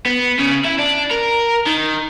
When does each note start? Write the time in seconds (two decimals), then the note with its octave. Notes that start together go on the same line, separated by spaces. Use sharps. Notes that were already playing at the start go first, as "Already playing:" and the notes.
0.06 B3
0.39 C#3
0.65 E4
0.79 D4
1.11 A#4
1.67 D#3